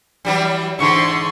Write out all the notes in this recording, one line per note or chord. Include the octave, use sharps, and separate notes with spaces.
E3 F#3 G3
G#2 D3 E3 C6 C#6